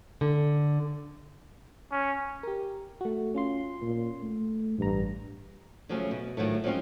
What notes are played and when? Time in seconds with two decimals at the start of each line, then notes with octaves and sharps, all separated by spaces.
0.21 D3
1.92 C#4
2.43 G4 A#4
3.01 A3 F#4
3.34 C#4 F4 C6
3.82 A#2
4.23 A3
4.79 A1 G2 A#5
5.89 C#3 F3 F#3 A3 C#4
6.11 B2
6.37 A2 D#3 F3 F#3 A3
6.64 F3 F#3 G#3 C4 C#4 F4